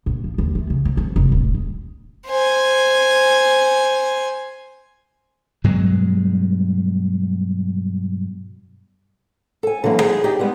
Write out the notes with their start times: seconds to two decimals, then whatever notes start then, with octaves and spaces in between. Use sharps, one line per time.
0.06 A#1
0.24 F3
0.38 D#2
0.55 A3
0.70 C#3
0.85 F3
0.97 F2
1.16 F1
1.32 D1
1.54 G#3
2.28 C5 G#5
5.64 G2 B2 F#3 G#3
9.63 A4 G#5
9.84 D3 E3 F#3 A#3
10.00 D#4 F#4 G#4
10.24 D#4 G4 G#4 D5
10.39 G3 G#3 B3